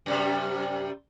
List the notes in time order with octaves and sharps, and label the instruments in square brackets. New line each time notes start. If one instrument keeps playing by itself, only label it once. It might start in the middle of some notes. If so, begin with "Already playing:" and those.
[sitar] F#2 C3 G3